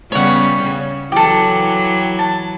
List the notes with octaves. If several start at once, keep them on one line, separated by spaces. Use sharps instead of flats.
C#3 G3 B3 C#5 F#5
C#3
E3 F#3 G4 A4
A5